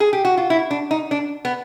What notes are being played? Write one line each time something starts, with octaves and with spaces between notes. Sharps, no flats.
G#4
G4
F#4
F4
E4
D4
D#4
D4
B3